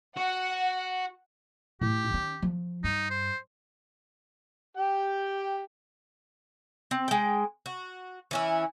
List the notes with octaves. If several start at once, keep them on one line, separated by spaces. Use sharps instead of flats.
F#4 F#5
A2 G4
D#3 C#4
F3
G2 D#4
C5
G4 G5
C4
G#3 G5
F#4
E3 C#4 E4